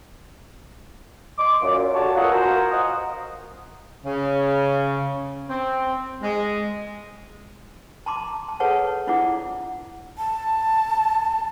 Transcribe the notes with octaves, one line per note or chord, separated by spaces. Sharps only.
D#5 C6 D6
F#2 A#2
D3 F#4 G4 C#5 A5
B3 F4 A4 A#4 D#5 F#5
F4 F#4 A#4 C5 G#5 A#5
C5 D#5 F5 F#5 D#6
C#3
C4
G#3
A5 A#5 C6 D6
A5
G#4 A4 B4 C#5 F#5 A5
D4 E4 F4 D5 F#5 D6
A5